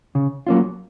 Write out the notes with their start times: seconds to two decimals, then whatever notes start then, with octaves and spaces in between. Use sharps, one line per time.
0.15 C#3
0.47 F#3 A#3 C#4 F4